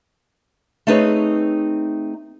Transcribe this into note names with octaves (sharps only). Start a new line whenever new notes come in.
A3 C4 D#4 G#4 B4 C#5